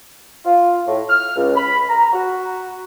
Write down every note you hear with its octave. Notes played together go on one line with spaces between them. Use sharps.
F4
A2
F6
C#2
B5
A#5
F#4